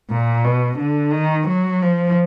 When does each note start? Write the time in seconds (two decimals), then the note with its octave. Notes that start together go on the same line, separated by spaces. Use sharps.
0.10 A#2
0.45 B2
0.79 D3
1.13 D#3
1.48 F#3
1.82 F3